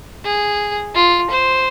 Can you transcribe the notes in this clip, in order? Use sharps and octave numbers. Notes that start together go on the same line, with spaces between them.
G#4
F4
C5